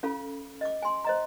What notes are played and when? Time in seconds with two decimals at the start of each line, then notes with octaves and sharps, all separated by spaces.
0.03 C#4 F4 A4 F5 B5
0.61 D#5 D6
0.82 G#5 C6
1.05 C5 D#5 A#5